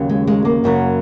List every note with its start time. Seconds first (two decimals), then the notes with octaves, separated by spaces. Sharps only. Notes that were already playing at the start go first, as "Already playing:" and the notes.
Already playing: D#2 C#3 F#3
0.09 G#3
0.27 G#3
0.45 A#3
0.64 F#2 C#3 F#3